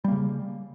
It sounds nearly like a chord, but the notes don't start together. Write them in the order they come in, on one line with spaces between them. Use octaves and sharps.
G3 A#3 C#3